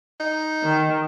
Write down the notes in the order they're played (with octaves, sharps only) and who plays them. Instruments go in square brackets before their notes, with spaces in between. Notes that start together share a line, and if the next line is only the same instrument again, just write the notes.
[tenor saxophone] D#4
[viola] D#3